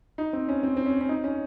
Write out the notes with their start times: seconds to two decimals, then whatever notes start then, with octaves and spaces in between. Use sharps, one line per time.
0.18 D#4
0.33 C4
0.49 C#4
0.63 C4
0.77 C4
0.86 C#4
1.01 C#4
1.09 D#4
1.24 C#4